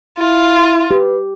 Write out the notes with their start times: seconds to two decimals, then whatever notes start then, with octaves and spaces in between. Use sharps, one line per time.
0.19 E4 F4
0.91 G4 B4